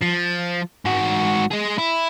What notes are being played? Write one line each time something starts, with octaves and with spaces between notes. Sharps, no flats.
F3
G#2 F#4
G#3 G#4
E4